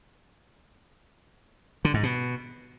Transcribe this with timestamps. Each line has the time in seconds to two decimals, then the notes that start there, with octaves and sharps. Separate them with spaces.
1.85 D3
1.94 G#2
2.03 B2